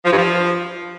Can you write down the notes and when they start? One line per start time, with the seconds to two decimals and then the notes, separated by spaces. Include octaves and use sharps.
0.05 F3
0.11 G2
0.18 F3